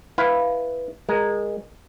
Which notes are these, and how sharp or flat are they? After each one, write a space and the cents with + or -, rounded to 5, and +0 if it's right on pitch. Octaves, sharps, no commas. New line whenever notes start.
E4 +0 B4 +0 F5 +0
G#3 -15 A#4 +0